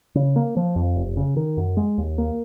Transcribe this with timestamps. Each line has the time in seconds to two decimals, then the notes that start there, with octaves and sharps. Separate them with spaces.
0.15 C#3
0.36 A#3
0.57 F3
0.76 F2
0.96 F1
1.17 C#3
1.37 D#3
1.57 F#2
1.77 G#3
1.98 D#2
2.18 A#3